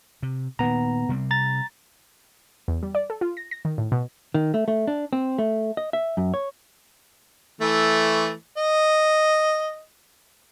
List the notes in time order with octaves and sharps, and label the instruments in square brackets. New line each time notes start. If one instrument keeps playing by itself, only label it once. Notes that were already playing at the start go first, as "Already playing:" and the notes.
[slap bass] C3
[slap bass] A#2 D#3 [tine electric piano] B3 A#5
[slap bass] C3 G3 C4
[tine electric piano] A#5 A6
[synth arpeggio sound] E2
G3
D5
A4
F4
A#6
A#6
D#3
A2
B2
[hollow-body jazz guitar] D#3
A3
A3
D4
C4
A3
D#5
E5
F#2
C#5
[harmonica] E3 A3
D#5